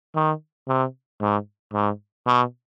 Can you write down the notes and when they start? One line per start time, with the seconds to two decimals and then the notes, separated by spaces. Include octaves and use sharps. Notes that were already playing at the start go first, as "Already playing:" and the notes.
0.15 D#3
0.68 C3
1.21 G#2
1.74 G#2
2.27 B2